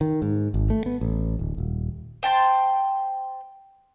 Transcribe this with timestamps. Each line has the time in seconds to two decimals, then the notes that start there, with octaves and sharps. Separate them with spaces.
0.01 D#3
0.22 G#2
0.54 G#1
0.70 A3
0.86 B3
1.01 A1
1.39 D1
1.58 D#1
2.23 C5 G5 A5 C6